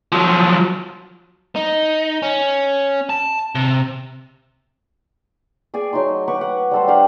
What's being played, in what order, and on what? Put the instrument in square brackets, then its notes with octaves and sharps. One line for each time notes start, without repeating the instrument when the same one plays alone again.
[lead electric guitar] F3 F#3
[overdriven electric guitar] D#4
C#4
A5
C3
[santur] G#4 D5 G#5
F#3 A3 D#4 C6
B4 F#5 C#6 D6
F#5
G3 A4 C5
D4 G4 F5 F#5